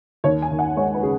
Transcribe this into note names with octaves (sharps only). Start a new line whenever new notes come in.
D#2 C#5
G#5
D#2
F#5
G#3 C#5
B4
C#3 G#4